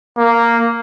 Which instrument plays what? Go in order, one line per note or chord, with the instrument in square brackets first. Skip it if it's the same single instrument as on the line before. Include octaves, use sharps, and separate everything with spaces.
[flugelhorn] A#3